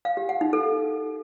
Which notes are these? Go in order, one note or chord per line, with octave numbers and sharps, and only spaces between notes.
F5
G4
F#5
D#4
A4